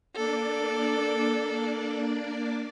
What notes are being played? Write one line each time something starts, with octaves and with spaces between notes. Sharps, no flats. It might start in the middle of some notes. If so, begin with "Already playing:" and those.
A#3 D4 A4 D5